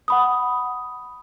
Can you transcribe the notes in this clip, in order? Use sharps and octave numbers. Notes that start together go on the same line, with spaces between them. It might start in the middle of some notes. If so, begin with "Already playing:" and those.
F#5 B5 D#6